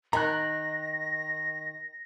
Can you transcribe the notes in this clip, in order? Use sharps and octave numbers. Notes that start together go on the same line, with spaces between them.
D#3 A#5 F#6 A#6